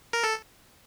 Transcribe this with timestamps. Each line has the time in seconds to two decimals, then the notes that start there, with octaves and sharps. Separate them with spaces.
0.13 A#4
0.24 A4